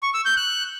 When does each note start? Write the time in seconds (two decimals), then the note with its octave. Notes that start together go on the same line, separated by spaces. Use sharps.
0.03 C#6
0.14 E6
0.25 G6
0.37 F#6